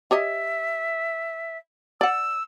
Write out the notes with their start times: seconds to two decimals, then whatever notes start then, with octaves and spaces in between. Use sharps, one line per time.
0.11 G4 C#5 D#5 E5
2.01 D5 F#5 E6